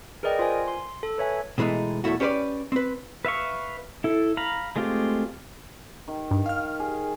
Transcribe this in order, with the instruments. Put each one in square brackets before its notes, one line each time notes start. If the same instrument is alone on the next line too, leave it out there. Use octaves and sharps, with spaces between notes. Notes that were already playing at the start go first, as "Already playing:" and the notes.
[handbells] G#4 A#4 B4 D5 D#5 G5
F4 C5 G#5
C6
A4
B4 C#5 E5 G#5
[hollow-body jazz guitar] B2 E3 G#3 A3 D#4
B1 E2 G#2 A3 E4 F#4
C#4 G4 B4 C5 D5
C4 B4
[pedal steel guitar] B4 E5 F5 C#6
E4 A4
F5 A#5 B5
G#3 A3 C4 F4 G4
[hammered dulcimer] D#3
[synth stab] G2
F5 F6
[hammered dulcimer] G#4